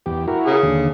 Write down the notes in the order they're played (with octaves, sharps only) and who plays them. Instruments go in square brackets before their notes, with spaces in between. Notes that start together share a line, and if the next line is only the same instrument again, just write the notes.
[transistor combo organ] E2 G4
E4 F#4 A#4
[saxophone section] C#3 G#4
[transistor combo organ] D#2 D3